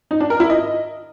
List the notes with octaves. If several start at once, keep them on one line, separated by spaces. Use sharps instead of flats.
D#4
D4
A#4
E4
D#5